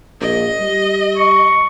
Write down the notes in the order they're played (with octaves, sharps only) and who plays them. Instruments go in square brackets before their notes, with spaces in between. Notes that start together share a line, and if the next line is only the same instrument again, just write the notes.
[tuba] A#1 [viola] D#5
[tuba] G3
[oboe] C#6